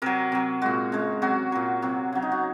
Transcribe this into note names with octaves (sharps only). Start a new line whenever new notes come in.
C3 F#3 A#4
C3 F#3
A#2 G#3 F#4
C#3 G#3
C3 F#3 F#4
A#2 F#3
C3 F#3
C#3 F#3
D#4
F#4